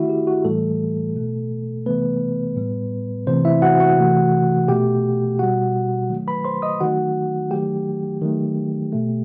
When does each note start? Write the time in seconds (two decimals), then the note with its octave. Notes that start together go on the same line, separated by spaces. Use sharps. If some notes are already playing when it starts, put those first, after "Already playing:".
Already playing: D#3 A3 E4 F#4 E5
0.09 G4
0.27 F#4
0.44 A2 E3 G3 A3 A4
1.15 B2 A3
1.86 C3 E3 A3 B3 B4
2.57 A2 G3
3.27 C3 E3 A3 C4 C5
3.45 E4 E5
3.62 F#4 F#5
3.80 F#4 F#5
3.98 C3 E3 A3
4.68 B2 A3 G4 G5
5.39 B2 G3 F#4 F#5
6.10 D#3 F#3 A3
6.27 B4 B5
6.45 C5 C6
6.62 D#5 D#6
6.80 D#3 F#3 A3 F#4 F#5
7.51 D#3 F#3 A3 G4 G5
8.21 D#3 F#3 A3
8.92 B2 A3